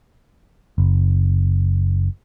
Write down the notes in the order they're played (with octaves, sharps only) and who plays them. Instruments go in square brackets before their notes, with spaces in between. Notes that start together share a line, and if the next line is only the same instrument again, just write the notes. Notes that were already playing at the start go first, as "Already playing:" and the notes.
[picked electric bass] F#1